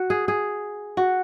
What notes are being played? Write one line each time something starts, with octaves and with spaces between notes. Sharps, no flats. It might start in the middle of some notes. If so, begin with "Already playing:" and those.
Already playing: F#4
G#4
G#4
F#4